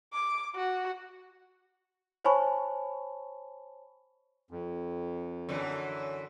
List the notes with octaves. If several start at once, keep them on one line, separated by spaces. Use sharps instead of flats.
D6
F#4
C5 C#5 G#5 A5 B5 C#6
F2
F#2 D3 E3